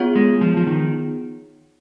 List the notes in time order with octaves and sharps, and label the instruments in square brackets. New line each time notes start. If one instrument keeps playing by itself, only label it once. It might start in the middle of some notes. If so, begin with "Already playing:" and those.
Already playing: [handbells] B3 F4 G#4 C#5 F#5
[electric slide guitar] G#3
F3
F3
D#3